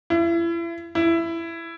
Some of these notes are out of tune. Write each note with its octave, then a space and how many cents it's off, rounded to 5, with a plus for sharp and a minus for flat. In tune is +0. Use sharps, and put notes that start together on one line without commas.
E4 +35
E4 +15